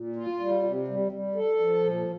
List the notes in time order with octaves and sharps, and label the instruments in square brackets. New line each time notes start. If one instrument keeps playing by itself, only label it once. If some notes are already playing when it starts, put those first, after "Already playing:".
Already playing: [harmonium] A#2
F4
G3
C3
G3
G3
A4
F3
A#2